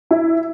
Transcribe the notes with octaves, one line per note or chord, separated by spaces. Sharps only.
E4